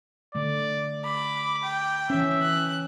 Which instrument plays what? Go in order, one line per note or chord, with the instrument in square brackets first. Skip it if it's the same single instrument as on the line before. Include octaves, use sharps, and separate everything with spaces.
[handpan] D3 A3 [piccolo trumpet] D5
[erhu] B5 [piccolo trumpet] D6
[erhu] G5
[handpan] E3 C#4 [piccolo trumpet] E5
[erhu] F#6